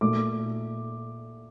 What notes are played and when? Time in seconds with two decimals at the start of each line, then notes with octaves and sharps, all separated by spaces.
0.01 A#2 A3 D6